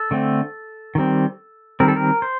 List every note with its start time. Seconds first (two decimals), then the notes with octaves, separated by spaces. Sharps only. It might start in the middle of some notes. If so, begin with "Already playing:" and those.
Already playing: A4
0.11 D3 A3 C4
0.95 D#3 G3 C4
1.80 D#3 G3 C4 A#4
1.88 A4
1.96 A#4
2.22 C5